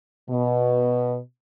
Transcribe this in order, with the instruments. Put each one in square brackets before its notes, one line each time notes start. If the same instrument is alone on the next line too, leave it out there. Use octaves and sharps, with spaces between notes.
[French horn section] B2